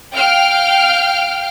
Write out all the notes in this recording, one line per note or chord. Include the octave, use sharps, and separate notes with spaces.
F5 G5 F6 D7